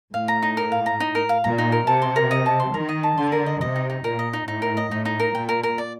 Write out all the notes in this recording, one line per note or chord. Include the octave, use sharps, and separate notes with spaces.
A2 F5
A#5
D#4
A#4
F5
A#5
D#4
A#4
F5
A#2 A#5
D#4
A#4
C3 A5
C6
A#4
D#5
A5
C6
D#3 A#4
D#5
A5
D3 C6
A#4
D#5
C3 D#5
D#4
D#4
A#2 A#4
D#5
D#4
A2 D#4
A#4
D#5
A2 D#4
D#4
A#4
A#2 G5
A#4
A#4
D5